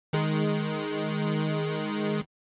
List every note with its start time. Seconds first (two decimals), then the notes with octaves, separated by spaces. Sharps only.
0.13 D#3 G#3